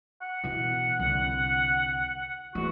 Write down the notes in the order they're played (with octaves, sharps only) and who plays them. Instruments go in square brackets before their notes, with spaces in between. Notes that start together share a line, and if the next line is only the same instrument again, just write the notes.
[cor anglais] F#5
[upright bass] B2 E3
C2 D3
[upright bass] E2 A3 [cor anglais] F#4